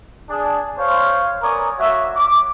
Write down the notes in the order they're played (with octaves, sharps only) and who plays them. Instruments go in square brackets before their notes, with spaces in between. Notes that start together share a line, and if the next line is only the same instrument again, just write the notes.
[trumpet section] D4 G#4
C5 C#5 F5
B3 C#4 A#4 C#5 D5 D#6
A#3 F#4 C#5 E5
D6